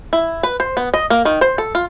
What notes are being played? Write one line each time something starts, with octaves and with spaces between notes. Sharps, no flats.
E4
B4
C5
B3
D#5
A#3
D#3
C5
A4
F4